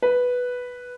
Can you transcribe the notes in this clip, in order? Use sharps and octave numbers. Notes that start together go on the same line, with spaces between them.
B4